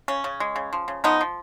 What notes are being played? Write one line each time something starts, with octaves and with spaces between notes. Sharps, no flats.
C#3 C#4
C#3
G#3
C#3
F3
C#3
F3 B3 D#4
F3